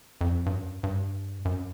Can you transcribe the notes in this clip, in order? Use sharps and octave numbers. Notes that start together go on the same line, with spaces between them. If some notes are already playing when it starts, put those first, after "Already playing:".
F2
G2
F#2
G2
F#2